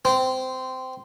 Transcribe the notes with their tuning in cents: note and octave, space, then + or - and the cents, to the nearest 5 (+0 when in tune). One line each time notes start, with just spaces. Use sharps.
C4 -15